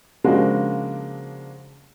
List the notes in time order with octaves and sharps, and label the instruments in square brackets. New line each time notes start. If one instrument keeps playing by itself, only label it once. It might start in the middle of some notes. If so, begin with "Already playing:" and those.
[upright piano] C#3 F3 G#3 A#3 D4 F#4